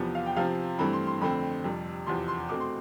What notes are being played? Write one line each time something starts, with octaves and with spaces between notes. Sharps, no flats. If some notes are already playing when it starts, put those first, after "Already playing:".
Already playing: E2 C3 F3 B3
F5
G5
C3 F3 C4 F5
G2 E3 A3 C4 B5
C6
C6
F2 D3 A3 C4 B5
F2 C3 G3
E2 C3 F3 C6
C6
B2 A3 C4 D6
C6